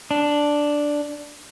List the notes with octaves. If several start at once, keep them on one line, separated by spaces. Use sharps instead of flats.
D4